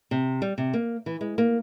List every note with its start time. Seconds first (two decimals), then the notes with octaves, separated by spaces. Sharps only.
0.11 C3
0.42 G3
0.58 C3
0.74 A#3
1.06 E3
1.21 G#3
1.38 A#3